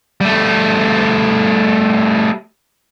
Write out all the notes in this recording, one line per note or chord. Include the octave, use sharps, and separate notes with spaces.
G3 A3